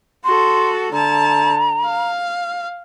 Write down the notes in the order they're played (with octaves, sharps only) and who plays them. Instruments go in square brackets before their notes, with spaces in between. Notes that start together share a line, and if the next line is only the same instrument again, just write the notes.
[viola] F#4 A4 [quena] C6
[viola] D3 A5 [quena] A#5
[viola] F5